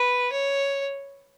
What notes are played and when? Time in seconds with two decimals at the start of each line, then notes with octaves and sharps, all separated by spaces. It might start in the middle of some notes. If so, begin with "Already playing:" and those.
Already playing: B4
0.32 C#5